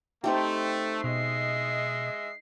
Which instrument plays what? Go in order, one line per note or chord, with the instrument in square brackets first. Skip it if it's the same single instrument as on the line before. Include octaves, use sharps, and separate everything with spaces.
[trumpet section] A3 [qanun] C4 D#4 G4
[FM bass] B2 [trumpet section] G#3 D#5 E5 [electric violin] C7